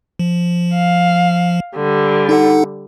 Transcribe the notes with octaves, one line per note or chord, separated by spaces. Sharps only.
F3
F5
D3 G3
D#4 A4 F#5